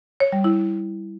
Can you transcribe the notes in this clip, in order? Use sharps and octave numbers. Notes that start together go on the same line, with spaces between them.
C#5
G3
E4